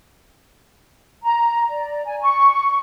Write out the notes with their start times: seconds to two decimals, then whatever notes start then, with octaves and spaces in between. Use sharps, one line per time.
1.24 A#5
1.69 D5
2.05 G#5
2.22 C#6